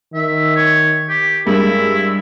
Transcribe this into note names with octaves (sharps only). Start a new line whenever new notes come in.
D#3 E5
C#5
G4
G2 G#3 E4 A#4